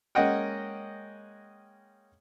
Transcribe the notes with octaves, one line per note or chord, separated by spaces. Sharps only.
G#3 A#3 C#4 D#5 F#5 G5